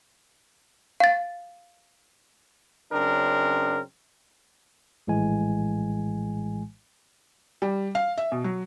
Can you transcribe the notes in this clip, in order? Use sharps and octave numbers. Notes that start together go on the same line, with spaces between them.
F5 A6
F#2 C#3 C4 D4 A#4
A#1 A2 E3 G#3 G#5
G3
F5
E5
B2
F#3